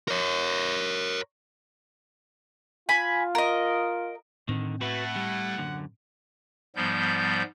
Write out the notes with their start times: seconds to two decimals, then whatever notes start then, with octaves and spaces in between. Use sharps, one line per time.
0.08 A#4 C#5
2.89 F4 G#5 B5
3.35 A#4 D#5
4.49 A2 D3 D#3 C4
4.81 A3 E4 F#4 B4 F#5
5.16 G3
5.58 F#2 D3
6.76 G#2 F3 G3 B3 G6